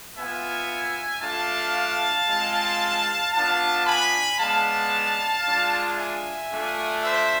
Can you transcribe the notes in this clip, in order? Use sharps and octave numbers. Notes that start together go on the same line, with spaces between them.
B3 F4 E5 G#5
A3 D4 F4 F5 A5
G#3 C4 F4
B3 D4 F4 F5 A5
G#5 B5
G#3 B3 D4 F5 A5
G#3 D4 F4
E5 G#5
A3 D4 F4
C5 E5